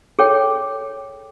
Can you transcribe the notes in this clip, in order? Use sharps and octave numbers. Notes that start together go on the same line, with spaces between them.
G#4 A4 C#5 G5